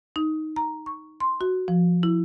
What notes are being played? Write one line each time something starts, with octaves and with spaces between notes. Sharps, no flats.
D#4
A#5
C#6
C6
F#4
F3
E4